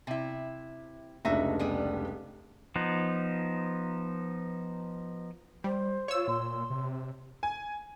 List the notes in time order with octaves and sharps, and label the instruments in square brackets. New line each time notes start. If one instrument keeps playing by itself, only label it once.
[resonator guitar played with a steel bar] C3 E4
[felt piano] F1 C#2 D4 [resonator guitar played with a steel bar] D#4 F#4 E5
[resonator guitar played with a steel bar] G3 B3 G#4
[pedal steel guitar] F3 B3 D#4
[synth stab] G3 [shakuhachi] C5
[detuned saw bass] F4 [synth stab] C#5 E6
[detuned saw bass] A#2 [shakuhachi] C6
[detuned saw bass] C3
[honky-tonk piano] G#5